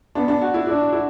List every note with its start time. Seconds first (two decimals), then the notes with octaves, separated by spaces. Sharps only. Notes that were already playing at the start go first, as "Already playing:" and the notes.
0.15 B3 D4
0.28 D4
0.41 F#4
0.54 E4
0.67 D4 E4
0.93 E4